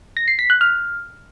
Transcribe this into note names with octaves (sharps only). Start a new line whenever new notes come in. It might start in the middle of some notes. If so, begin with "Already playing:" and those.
A#6
C7
B6
F#6
F6